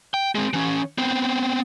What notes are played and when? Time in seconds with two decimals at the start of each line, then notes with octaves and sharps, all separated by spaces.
0.14 G5
0.35 G#3 C4
0.53 E3 C#4
0.98 B3 C4